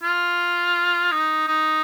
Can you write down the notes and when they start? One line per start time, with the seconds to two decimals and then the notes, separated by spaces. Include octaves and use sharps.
0.03 F4
1.12 D#4
1.47 D#4